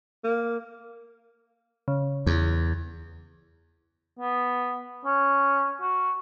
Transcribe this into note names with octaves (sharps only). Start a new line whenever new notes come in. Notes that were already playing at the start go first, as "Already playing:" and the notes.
A#3
C#3
E2
B3
C#4
F#4